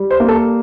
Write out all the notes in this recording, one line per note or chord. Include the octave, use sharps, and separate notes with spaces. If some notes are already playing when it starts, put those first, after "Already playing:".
Already playing: G3
C5
A#3
A4